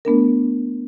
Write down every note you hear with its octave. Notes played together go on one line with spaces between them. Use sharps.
A3 B3 D4 A#4